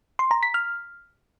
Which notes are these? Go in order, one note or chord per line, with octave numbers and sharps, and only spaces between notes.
C6
A#5
B6
F6